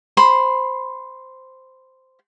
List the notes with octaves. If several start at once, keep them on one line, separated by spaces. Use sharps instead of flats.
C5 B5 C6